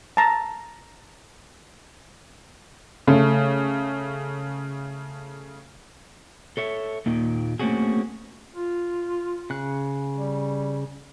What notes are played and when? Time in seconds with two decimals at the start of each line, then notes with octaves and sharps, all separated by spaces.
0.17 A5 A#5
3.07 C#3 A3
6.57 A4 C#5 E5
7.06 D#2 A#2 D#3
7.59 A3 A#3 C4 C#4 F#4 G#4
8.55 F4
9.50 C#3 F#6
10.16 G3